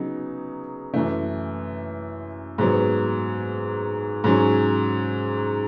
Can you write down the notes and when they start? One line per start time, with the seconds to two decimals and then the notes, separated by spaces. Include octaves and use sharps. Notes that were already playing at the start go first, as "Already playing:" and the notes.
Already playing: C#3 F#3 B3 D#4
0.94 F#2 E3 A3
2.58 G#2 F#3 B3
4.24 G#2 F#3 C#4